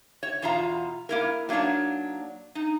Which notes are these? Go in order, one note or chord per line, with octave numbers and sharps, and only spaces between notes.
C#5
E2 B2 F4 F5 A#5
A#3 E4 A#4
F#3 A#3 D4 D#4 C#5
D#4